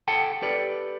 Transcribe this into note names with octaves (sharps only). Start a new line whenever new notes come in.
A4 F#5 G5 A5
G4 A4 B4 D5